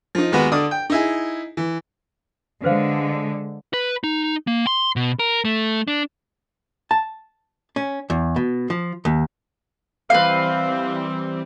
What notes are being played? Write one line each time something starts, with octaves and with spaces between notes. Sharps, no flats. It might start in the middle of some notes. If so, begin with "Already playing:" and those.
F3 D#4
D#2 G#3 B3 F#4 B4
D3 D5 D#6
G5
D#4 E4 G#4
E3
D3 G#3 B4 C5 F5
B4
D#4
A#3
C6
B2
A#4
A3
D4
A5
C#4
E2
B2
F3
D#2
E3 G3 C4 B4 F5